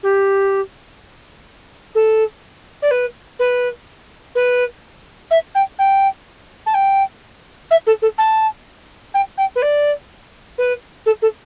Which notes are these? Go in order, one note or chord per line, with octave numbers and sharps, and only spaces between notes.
G4
A4
D5
B4
B4
B4
E5
G5
G5
A5
G5
E5
A4
A4
A5
G5
G5
B4
D5
B4
A4
A4